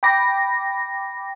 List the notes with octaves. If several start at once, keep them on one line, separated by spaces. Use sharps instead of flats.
G5 B5 D6 A#6